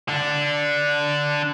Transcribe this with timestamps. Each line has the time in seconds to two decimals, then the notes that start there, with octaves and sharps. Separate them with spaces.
0.08 D3 D4